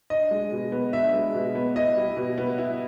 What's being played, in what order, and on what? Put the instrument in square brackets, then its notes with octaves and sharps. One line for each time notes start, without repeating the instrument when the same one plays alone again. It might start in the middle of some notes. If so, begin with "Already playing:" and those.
[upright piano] D4 [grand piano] D#5
[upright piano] G#3
B2
B3
[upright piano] D4 [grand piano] E5
[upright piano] G#3
B2
B3
[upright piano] E4 [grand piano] D#5
[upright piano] G3
B2
B3
E4